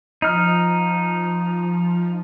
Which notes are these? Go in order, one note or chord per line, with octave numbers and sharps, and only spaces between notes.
F3 D#4 F6